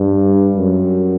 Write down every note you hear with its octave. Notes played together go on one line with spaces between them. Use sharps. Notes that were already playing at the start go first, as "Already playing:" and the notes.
Already playing: G2
F#2